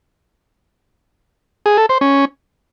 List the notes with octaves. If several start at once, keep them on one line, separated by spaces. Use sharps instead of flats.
G#4
A4
C5
C#4